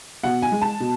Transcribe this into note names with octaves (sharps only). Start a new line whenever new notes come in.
B2 F#5
G#5
G#3
A5
B2